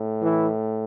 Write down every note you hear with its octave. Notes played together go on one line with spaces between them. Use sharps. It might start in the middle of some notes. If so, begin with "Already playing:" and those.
Already playing: A2
E3 E4